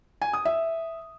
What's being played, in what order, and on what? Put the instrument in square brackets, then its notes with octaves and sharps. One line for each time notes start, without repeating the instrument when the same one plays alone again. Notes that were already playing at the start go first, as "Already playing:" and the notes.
[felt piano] G#5
D#6
E5